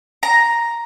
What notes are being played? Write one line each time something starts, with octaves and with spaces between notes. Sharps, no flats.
A#5